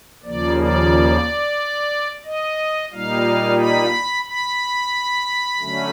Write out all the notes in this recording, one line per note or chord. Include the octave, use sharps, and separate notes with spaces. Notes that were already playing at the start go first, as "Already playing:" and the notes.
D#2 C#3 F3 A#3 D5
D5
D#5
A#2 G3 A#3 D#4 F5
B5
B5
D3 F#3 A3 C#4